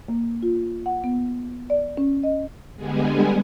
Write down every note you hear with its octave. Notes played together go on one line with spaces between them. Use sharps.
A#3
F4
F#5
B3
D5
C#4
D#5
D3 G3 G#3 B3 G#4